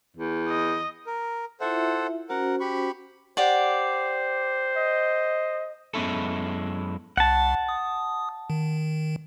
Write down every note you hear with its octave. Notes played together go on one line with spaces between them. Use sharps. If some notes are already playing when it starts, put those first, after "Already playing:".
E2
D#5
A#4
E4 F4 A4 C5 E5 F#5
C#4 F#4 A#4 C5 F#5
G4 B5 C#6
G4 C5 D5 F#5
D#5
F#2 G#3 B3 C#4 E4 A4
C2 F#5 A5
D#6
D#3